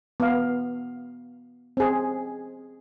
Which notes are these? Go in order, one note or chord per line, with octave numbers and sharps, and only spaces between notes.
B3 F5
C4 G#4